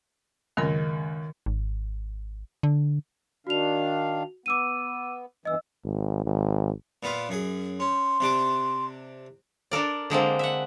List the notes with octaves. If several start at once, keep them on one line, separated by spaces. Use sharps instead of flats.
C#2 F#2 D#3 A#4
G#1
D3
D#3 D4 F#4 F5 F7
B3 D6 E6 D#7
E2 G2 E3 D#5 E6
G#1
G#1
A#2 B3 F4
F#2 G#4
C#4 C6
C3 D4 D6
D4 A4 A#4 D5
D3 G#3 A#3 C4
E5 F#5